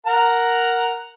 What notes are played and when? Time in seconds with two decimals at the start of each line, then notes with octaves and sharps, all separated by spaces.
0.06 A#4 F#5 A#5